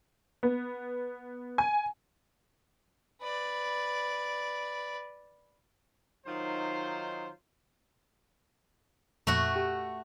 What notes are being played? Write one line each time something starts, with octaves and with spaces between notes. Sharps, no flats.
B3
G#5
B4 D5
D#3 F#3 D#4 F4 C5
F2 A#2 A3 F#4
G4